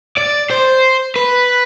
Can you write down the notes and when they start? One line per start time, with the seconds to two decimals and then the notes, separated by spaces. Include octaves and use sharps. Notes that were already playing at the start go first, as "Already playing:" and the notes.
0.17 D5
0.50 C5
1.16 B4